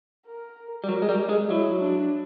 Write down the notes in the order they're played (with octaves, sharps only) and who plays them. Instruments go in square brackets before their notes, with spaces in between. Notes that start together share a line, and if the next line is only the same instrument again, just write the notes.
[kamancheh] A#4
[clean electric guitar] G3
[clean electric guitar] F#3 [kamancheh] A#4
[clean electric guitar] G#3
G3
G#3
[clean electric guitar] F#3 [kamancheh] E4
[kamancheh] D4